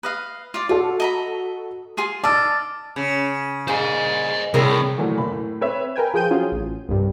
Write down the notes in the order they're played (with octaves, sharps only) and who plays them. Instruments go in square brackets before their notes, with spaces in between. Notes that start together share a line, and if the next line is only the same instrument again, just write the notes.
[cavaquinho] B4 D#5 F5
F4 D5
[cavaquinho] F4 [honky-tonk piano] F#4 A4
[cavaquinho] D#5 A#5 B5
F4 G#4 C6
[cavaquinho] D5 D#5 [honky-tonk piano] A5 E6 F6
[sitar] C#3
[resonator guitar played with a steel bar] A#2 G#4 [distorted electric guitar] C5 D#5
[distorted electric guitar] C2 [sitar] A2 G3 [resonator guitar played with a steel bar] C4 G#4 A#4
[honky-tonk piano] A#2 E3 F#3 A3
F#1 B5
A2
C4 B4 C#5 E5
[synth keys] A#4 B4 G5 G#5
F3 G#4 G5 G6 D#7
F#3 C#4 F4 G#4
A1
C2 G2